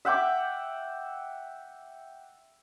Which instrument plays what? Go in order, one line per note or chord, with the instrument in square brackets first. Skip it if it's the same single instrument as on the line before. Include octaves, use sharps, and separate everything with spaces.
[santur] E5 F#5 G5 D6